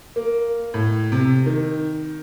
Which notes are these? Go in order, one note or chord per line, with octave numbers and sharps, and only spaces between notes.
A#3
A2
C3
D#3